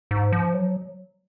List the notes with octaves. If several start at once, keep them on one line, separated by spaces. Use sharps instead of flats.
G#2
F3
F#3